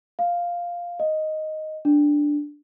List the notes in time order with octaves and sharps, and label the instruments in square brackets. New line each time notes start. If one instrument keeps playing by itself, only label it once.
[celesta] F5
D#5
D4